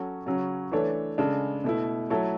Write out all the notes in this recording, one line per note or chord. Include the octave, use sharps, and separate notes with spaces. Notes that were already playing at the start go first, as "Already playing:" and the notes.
Already playing: F#3 C#4 F#4 A4
C#3 F#3 C#4 F#4
E3 A3 D4 A4 C#5
C#3 G#3 D4 A4
B2 A3 E4
F#3 A3 E4 A4 C#5